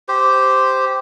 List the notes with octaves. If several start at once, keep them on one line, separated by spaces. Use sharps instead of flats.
G4 C5